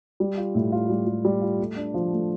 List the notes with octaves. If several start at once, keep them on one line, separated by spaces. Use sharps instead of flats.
G3
F4
A2
F4
G3
G3
G3
F4
A3
D4
F3
A3